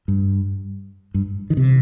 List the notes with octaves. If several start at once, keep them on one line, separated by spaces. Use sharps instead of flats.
G2
G2
D#3
C3